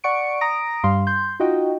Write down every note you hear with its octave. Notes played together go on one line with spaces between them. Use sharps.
D5 F#5 C#6 C#7 D7
A#5 D#6 A#6 D7
G2 G3 F5 C6
C6 G6
D#4 F4 F#4 D#5 G5